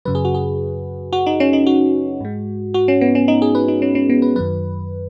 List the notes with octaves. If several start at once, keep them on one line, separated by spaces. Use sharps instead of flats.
F#2 C#3 F#3 B4
G#4
F#4
G#4
F#4
D#4
C#4
D#4
F#4
G#2 G#3
F#4
C#4
B3
C#4
D#4
G#4
B4
D#4
C#4
C#4
B3
B4
F#2 D#3 F#3 B4